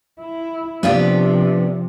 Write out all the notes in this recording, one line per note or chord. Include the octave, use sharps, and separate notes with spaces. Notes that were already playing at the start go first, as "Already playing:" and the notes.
E4
C3 F3 A#3 B3 D4 G4 F5